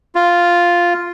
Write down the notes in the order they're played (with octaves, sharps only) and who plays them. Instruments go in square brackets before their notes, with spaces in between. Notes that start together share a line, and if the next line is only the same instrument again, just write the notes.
[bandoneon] F4